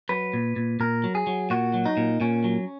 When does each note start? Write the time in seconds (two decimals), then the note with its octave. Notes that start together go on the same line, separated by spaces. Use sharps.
0.09 F#3 B4
0.33 A#2
0.56 A#2
0.80 A#2 A#4
1.04 F#3
1.15 G#4
1.27 F#3
1.50 A#2 F#4
1.74 F#3
1.86 D#4
1.97 A#2
2.20 A#2 C#4
2.44 F#3